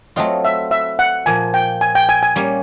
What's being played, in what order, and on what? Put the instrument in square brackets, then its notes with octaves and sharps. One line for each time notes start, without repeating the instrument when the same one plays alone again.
[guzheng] F#3 A3 C4 F4 [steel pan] D#5
[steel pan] E5
E5
F#5
[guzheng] A#2 F3 A#3 [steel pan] G#5
[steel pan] G5
G#5
G5
G#5
G#5
[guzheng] G3 A#3 C#4